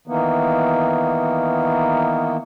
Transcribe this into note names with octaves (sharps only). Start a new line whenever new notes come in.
D#3 E3 A#3 B3